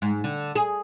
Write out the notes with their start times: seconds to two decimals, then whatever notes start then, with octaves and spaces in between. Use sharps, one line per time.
0.02 G#2
0.24 D3
0.56 G#4